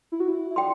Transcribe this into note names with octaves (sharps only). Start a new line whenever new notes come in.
E4
F#4
E4
E4
D4 G5 C6